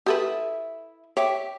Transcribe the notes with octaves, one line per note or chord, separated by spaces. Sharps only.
E4 G4 A4 B4 E5 D#6
G4 C#5 E5 D6